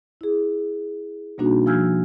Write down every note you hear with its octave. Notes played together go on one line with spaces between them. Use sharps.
E4 G#4
B2 G3 A#3 D4 D#4 F#4
F3 G#5 E6 F6 G6 G#6